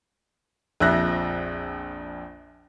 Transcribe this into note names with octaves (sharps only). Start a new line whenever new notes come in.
A#1 F2 F3 E5 F#6 A#6